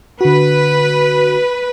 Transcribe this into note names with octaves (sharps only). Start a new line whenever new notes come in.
D3 F#4 B4